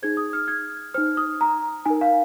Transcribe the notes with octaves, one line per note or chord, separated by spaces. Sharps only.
D#4 G#4 C5 G#6
D#6
F6
G#6
D#4 C5 F6
D#6
A#5
D#4 A#4 G#5
F5